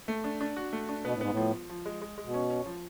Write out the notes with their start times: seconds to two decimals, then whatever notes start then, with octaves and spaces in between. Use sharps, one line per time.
0.08 A3
0.24 D4
0.41 D4
0.57 F#4
0.73 A3
0.89 D4
1.05 B2 B3
1.14 A2
1.21 G#2 B3
1.30 A2
1.37 F3
1.53 F3
1.69 F3
1.86 G#3
2.02 G#3
2.18 G#3
2.25 B2
2.34 C#4
2.50 C#4
2.66 F3